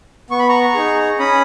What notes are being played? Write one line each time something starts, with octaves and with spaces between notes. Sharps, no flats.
B3 C#6
B5
A#5 C#6
D#4 G#4
C#4 B5 D#6